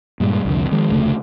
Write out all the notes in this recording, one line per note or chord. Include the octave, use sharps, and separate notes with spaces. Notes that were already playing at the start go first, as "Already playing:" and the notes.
G2 A#2 G3 G#3
C2 F2 D3
D#3 F3 G#3
F1 D2 C#3 A3